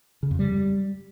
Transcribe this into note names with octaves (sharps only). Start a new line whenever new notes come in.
C#3
F2
G3